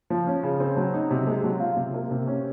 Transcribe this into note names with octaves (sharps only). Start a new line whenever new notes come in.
F3
C#4
C#3
C4
F#3
D#4
C3
G#3
F#3
F4
C3
A#3
C3
C#4